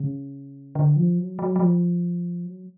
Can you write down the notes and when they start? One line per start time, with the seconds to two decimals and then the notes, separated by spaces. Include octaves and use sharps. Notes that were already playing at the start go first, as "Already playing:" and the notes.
Already playing: C#3
0.75 D3
0.96 F3
1.18 F#3
1.39 F#3
1.56 F#3
1.60 F3
2.45 F#3